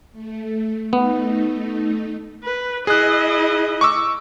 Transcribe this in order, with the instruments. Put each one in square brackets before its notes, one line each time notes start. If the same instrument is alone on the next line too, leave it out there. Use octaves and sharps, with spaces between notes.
[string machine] A3
[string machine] A3 D#4 [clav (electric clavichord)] B3
[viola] B4
[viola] E4 D#5 [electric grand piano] G#4 F#6
[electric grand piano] C#6 D6 E6